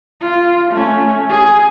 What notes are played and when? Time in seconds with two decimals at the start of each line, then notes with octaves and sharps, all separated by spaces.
0.21 F4
0.72 A3 C#4
1.30 G#4